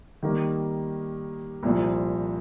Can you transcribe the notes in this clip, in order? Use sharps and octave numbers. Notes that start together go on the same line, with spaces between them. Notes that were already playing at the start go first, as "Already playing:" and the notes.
D#3 G3 A#3 D#4
C2 A#2 F3